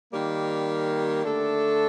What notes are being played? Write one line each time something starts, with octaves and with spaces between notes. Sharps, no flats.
D#3 G3 A#3
D3 A3 D4 A4